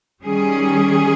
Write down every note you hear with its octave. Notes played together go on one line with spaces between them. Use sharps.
D#3 G3 C#4 G#4